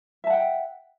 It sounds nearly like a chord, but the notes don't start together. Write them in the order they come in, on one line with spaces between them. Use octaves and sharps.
E5 A5 F#5 G5